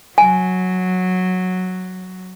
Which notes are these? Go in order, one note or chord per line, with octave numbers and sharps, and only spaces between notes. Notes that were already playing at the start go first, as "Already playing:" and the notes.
F#3 G#5